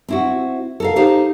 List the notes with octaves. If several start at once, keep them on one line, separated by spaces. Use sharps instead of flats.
C4 E4 F#4
A4 A#4 F5
D#4 G4 C5 F5